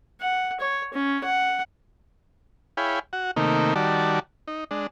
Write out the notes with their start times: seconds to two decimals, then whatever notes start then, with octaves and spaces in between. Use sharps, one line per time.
0.21 F#5
0.60 C#5
0.93 C#4
1.24 F#5
2.77 E4 G#4 C#5 F5 G5 B5
3.13 F#4 F#5
3.36 C3 D#3 A3 A#3 D#4
3.76 D#3 G3 F#4 D5 A5
4.48 D#4
4.71 G#3 D4